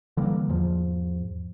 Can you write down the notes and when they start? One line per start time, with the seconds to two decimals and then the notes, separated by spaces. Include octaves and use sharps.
0.17 D3 E3 G3 A#3
0.49 E2 G#2 F3